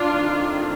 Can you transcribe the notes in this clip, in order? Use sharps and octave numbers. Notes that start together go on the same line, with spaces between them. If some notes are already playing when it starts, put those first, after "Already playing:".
Already playing: D4 F4
D#3 A3 C4